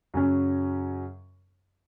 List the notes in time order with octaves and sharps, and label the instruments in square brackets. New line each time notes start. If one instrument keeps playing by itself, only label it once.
[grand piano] F#2 C#3 F#3 C#4